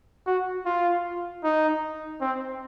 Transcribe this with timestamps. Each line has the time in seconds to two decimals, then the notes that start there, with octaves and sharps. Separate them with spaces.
0.26 F#4
0.66 F4
1.44 D#4
2.21 C4